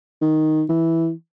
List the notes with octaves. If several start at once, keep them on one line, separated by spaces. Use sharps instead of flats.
D#3
E3